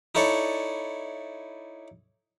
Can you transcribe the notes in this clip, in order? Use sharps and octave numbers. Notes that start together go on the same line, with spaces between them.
D#4 E4 A4 C#5 D5